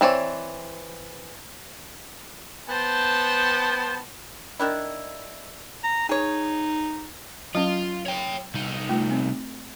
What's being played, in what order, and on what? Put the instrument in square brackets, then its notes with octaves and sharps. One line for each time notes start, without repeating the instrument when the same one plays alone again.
[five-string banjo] E3 C4 C#5 D5
[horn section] B3 C5 G5 A5
[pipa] D#3 D4 E4
[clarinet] A#5
[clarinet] D#4 [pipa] G#4 C#5
[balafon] F#3 C#4 [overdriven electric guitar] F4
[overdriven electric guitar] C#5 G5
C2 D#4
[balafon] A3 F4
C4